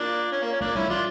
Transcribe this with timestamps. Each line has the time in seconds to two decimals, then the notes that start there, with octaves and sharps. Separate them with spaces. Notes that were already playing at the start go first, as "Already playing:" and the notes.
Already playing: A#3 D4 F4
0.32 C#4
0.42 A#3
0.52 C#4
0.61 A3 A#3 D4
0.75 G3 C#4 E4
0.88 F3 D4 F4